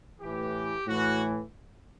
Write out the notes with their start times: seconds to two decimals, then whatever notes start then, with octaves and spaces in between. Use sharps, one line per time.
0.20 A2 E3 G4
0.87 A2 E3 F#4